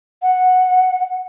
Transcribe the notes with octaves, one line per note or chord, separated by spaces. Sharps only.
F#5